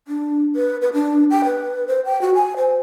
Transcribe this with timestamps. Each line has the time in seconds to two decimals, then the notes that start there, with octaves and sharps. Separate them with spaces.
0.08 D4
0.56 B4
0.82 B4
0.93 D4
1.30 G5
1.45 B4
1.88 C5
2.05 G5
2.21 F#4
2.35 G#5
2.57 C5